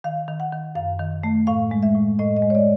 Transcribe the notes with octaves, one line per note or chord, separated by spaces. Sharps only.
D#3 F5
D#3
F#5
D#3
F#2 F5
D#3
A3
A2 F5
G#3
E5
A2
A2 D#5
D#5
G#3
C#5
D5